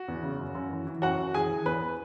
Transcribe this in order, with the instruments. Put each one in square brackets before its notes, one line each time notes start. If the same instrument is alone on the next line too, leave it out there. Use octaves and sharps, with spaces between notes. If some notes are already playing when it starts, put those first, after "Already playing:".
Already playing: [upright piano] F#4
E2
C#3
F#2
F#2
E3
E3
F#2 F#4 F#5
F#2
E3 G#4 G#5
E3
E2 B4